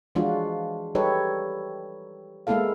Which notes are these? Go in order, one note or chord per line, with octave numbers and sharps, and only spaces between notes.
E3 F3 G#3 D4 F4 F#4
G3 D#4 G4 A4 B4 C#5
G#3 A#3 B3 E4 A4 F5